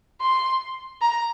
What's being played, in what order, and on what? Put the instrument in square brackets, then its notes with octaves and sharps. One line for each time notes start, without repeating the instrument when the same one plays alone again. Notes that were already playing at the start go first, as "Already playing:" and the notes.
[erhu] C6
A#5